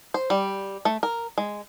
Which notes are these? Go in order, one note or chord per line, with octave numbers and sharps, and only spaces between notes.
C5
G3
A3
A#4
G#3